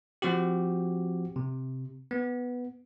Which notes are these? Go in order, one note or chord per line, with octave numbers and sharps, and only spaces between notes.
F3 C4 F#4 G4
C3
B3